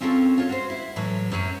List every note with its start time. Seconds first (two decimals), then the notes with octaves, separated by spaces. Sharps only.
0.01 C4 C#4 F4 F#4 A4 A#4
0.38 F4 C#5
0.49 F#4 C5
0.70 E4
0.96 A2 E3 F#3
1.31 F#2 E3 F#3